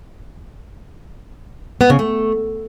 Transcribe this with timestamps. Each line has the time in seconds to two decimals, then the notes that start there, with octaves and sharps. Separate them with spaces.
1.81 B3
1.90 C#3
1.99 A3